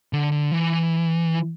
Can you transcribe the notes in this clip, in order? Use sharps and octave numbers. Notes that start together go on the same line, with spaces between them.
D3
D3
E3